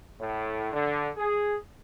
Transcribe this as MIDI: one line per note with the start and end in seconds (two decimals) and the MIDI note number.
0.20 0.67 45
0.72 1.08 50
1.17 1.56 68